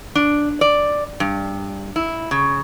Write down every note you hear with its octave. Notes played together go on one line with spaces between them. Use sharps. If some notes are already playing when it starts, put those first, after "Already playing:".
D4
D5
G2
E4
C#3